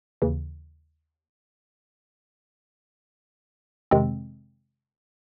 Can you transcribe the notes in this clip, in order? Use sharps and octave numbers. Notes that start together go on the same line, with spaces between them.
D#2 C#3 E3
F2 C3 D#3 G#3 C4